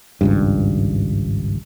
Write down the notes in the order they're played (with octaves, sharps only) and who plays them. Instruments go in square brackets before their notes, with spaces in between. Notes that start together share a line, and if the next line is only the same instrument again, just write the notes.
[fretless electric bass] G#1 C#2 G2